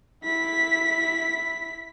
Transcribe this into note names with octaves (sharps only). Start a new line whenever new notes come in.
E4 B6